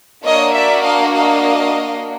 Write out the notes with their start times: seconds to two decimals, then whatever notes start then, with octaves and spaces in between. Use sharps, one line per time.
0.24 A#3 D4 F#4 C#5 D#5
0.54 D5 E5
0.84 D#5 F5
1.14 D#5 F5